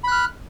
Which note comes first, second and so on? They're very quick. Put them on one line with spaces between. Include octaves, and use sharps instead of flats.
B5 F#6 F6